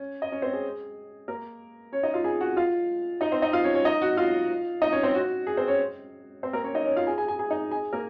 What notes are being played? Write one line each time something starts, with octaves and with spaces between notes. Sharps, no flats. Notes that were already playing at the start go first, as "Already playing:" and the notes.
Already playing: C#4
D#5
C#4 C#5
C4 C5
G#4
A#3 A#4
C#4 C#5
D#4 D#5
F4 F5
G#4 G#5
F#4 F#5
F4 F5
D#4 D#5
C4 C5
D#4 D#5
F4 F5
C#4 C#5
C#4 C#5
D#4 D#5
F#4 F#5
F4 F5
D#4 D#5
C#4 C#5
C4 C5
F#4
G#4
C4 C5
C#4 C#5
C4 C5
A#3 A#4
C#4 C#5
D#4 D#5
C#4 C#5
F4 F5
G#4 G#5
G#4 G#5
G#4 G#5
G#4 G#5
D#4 D#5
G#4 G#5
A#3 A#4